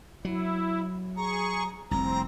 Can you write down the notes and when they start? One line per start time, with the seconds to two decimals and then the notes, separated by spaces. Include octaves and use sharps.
0.25 F#3 E4
1.17 G#4 A#5 C#6
1.91 F1 C2 C4 A#5